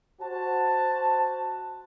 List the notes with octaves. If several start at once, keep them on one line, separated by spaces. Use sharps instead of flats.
F#4 C5 A5